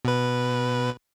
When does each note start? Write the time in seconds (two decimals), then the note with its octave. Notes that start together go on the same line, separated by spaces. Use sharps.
0.05 B2 B4